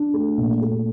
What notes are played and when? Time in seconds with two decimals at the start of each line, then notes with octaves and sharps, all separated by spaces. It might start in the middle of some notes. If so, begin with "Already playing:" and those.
Already playing: D4
0.14 A3
0.38 A#2
0.62 A3